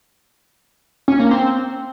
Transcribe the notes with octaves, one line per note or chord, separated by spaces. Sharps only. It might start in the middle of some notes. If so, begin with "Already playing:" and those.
C#4
A#3
C4